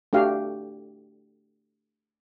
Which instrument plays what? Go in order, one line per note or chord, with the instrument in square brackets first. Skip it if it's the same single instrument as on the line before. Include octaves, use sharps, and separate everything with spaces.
[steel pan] A3 D4 F#4 G4 F5